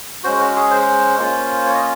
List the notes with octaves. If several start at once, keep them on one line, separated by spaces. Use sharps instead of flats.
G#3 C#4 F#4 C5
F#4
G#4
C5
A#3 C#4 F4
C#5
D#5